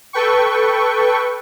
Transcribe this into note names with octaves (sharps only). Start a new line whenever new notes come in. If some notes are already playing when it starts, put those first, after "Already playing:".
A4 B4 G5 C#6